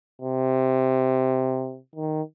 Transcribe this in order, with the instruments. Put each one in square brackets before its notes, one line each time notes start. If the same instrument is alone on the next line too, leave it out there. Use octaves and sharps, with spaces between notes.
[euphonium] C3
D#3